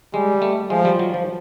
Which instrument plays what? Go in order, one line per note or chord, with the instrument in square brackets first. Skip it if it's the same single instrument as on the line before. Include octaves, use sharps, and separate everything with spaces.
[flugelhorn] G3 [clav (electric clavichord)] G#3
[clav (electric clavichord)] A3
[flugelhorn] F3 [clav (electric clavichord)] G#3
[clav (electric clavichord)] G3
F#3
F3